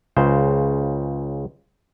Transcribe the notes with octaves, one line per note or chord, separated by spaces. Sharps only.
C#2 C#3 C5